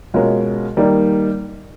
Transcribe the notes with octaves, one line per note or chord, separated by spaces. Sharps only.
B2 G#3 C#4 F4 A#4
D#3 G3 A#3 D#4